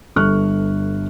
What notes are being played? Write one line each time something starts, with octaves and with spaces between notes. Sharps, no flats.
G1 G2 A4 C#6 F6 F#6